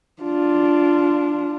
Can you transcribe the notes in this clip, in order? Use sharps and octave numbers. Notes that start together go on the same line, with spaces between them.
D4 F4